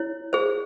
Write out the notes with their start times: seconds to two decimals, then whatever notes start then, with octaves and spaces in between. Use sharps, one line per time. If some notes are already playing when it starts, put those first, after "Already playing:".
Already playing: E4 C#5
0.33 G#4 C5